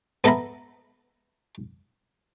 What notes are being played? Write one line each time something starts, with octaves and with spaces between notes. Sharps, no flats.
B3 A4 E5 A#5 B5